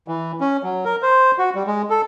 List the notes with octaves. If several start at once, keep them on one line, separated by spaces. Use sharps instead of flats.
E3
C#4
F#3
A#4
C5
F#4
G3
G#3
A4